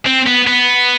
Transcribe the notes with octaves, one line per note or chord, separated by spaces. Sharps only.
C4
B3
B3